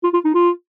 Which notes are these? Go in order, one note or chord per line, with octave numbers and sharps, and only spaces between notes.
F4
F4
D#4
F4